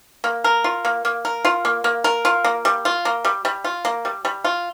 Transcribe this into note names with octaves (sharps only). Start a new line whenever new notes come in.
A#3
A#4
F4
A#3
A#3
A#4
F4
A#3
A#3
A#4
F4
A#3
G3
F4
A#3
G3
G3
F4
A#3
G3
G3
F4